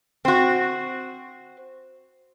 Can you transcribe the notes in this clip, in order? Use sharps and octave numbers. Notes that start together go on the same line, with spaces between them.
C4 F#4